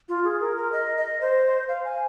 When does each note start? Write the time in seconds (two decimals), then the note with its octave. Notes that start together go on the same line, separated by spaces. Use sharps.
0.09 F4
0.24 G#4
0.41 A#4
0.57 A#4
0.73 D#5
0.97 D#5
1.21 C5
1.69 F5
1.85 G#5